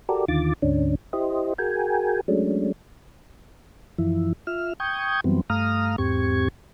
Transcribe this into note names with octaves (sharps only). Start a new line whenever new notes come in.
F#4 G4 A4 A#4 D5
D#2 D3 D#3 F4 D6 A6
D2 G#2 D3 C#4 D4
E4 G4 C5 D#5
F#4 G#4 A#4 G5 G#5
F#3 G#3 A3 C#4 D4
F#2 E3 F3 E4
F4 E5 F6
G5 C#6 D#6 G6 G#6
F#2 E3 F#3 G3 B3 C4
G2 A3 F5 A#5 D#6 F6
E2 G#2 C4 G4 C#6 G#6